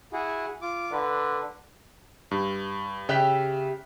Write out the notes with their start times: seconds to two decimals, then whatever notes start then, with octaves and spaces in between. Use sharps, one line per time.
0.12 E4 F#4 G#4
0.62 F4 D6
0.92 D3 B4
2.31 G2
3.09 C#3 G4 E5 G5 F#6 B6